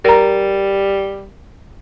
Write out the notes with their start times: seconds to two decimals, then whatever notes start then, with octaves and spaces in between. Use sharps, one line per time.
0.05 G3 A#4 A#5